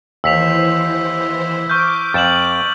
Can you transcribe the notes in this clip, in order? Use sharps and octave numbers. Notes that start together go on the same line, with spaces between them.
D#2 E3 C5 E6 B6 F7
C#6 D6 F6 G6
F2 A6 E7 F#7